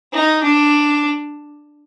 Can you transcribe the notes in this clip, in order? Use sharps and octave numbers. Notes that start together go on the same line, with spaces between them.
D#4
D4